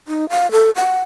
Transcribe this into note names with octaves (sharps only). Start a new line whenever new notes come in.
D#4
F5
A4
F#5